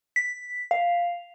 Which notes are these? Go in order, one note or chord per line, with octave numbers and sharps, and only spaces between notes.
B6
F5